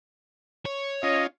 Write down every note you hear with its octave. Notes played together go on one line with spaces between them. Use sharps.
C#5
C#4 F4 D#5